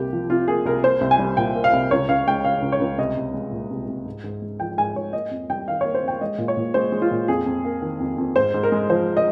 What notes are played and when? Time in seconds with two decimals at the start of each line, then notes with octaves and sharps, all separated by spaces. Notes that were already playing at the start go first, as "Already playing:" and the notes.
Already playing: C2 A#3 G4
0.13 F3
0.30 C3 F4
0.48 A#3 G#4
0.66 C2 A#4
0.84 A#3 C5
1.01 C2
1.11 G#5
1.19 G3
1.37 A#2 G5
1.55 A#3
1.64 F5
1.73 C2
1.91 C#2 C#5
2.09 C#2 F5
2.27 G#3 G5
2.45 C#3 F5
2.62 C#2
2.72 C#5
2.80 C#2
2.98 C2 D#5
3.17 C2
3.34 G#3
3.52 A#2
3.71 C2
3.88 C2
4.06 G#2
4.24 G#2
4.42 G#3
4.60 F3 G5
4.77 G#2 G#5
4.95 G#2 C#5
5.13 A#3 D#5
5.31 F2
5.50 G3 G5
5.68 D#3 F5
5.81 A#3 C#5
5.95 C5
6.03 F2 G5
6.21 G#3 D#5
6.38 A#2
6.48 C#5
6.57 A#2
6.74 G#3 C5
6.92 G#3
7.02 F4
7.11 A#2
7.28 F2 G#4
7.46 F2
7.65 A#3
7.82 D#3
8.00 F2
8.18 F2
8.36 G#2 C5
8.54 G#2
8.63 A#4
8.72 G#3
8.90 F3 C5
9.17 D#5